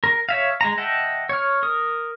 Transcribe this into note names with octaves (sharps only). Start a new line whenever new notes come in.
A#4
C#5 E5 F5
G#3 A#5
D#5 E5 F#5 G5 A5
C#5 F6
A#4 D#6